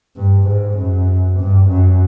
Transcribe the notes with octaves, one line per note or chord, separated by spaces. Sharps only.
G2
G#2
F#2
G2
F#2